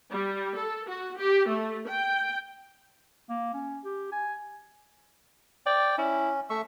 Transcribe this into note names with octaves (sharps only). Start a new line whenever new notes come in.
G3
A4
F#4
G4
A3
G5
A#3
C#4
G4
G#5
D5 G5
C#4 E4
A3 E5 C#6